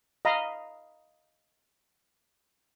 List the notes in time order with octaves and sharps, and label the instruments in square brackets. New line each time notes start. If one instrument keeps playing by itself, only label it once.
[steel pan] D#5 F5 A#5 B5